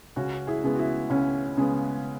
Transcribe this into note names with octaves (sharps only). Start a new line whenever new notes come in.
C#2 C#4 F#4
E4 G#4
C#3 G#3 B3
F#4
E4
C#2 C#4
C#3 G#3 B3